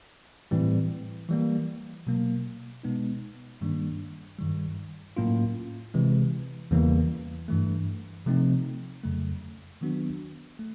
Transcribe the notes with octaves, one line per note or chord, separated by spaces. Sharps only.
A2 E3 G3 C4
E3 G3 A#3
B2 F#3 A#3
B2 G#3 B3 D#4
G2 D#3 G3 A#3 D4
G2 D#3 G3
A2 F#3 A#3 C#4 F4
C3 E3 G#3
E2 C#3 E3 G3 A#3
G2 E3 A3
C3 F3 A3 C4 D#4
F2 C#3 F#3 A3
D#3 F#3 B3 D4 F#4
A3